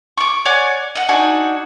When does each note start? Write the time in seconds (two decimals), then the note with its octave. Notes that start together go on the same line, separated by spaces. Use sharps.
0.17 C#6 D6
0.45 C#5 D5 F#5 G#5
0.95 D#5 F#5
1.08 D4 D#4 F#4 G#5